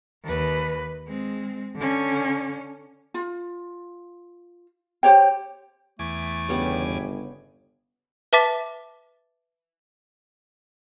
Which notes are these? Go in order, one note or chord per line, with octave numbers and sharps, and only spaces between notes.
D#2 B4
G#3 C4
D3 C#4
F4
G4 C5 C#5 G5
E2 A3 G#5 D6
G1 C#3 B3 G4
B4 E5 A5 D6 A6 B6